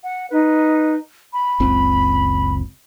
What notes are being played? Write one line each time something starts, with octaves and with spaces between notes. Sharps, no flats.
F#5
D#4 B4
B5
F#1 C#2 C4